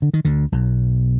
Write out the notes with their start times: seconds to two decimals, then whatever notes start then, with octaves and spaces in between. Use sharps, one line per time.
0.02 D3
0.14 D#3
0.25 D2 D3
0.52 B1 B2